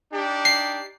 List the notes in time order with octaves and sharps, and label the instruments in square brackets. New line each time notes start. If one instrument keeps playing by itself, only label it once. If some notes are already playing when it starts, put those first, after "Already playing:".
[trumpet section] D4 D#4 G4
[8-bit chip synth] C7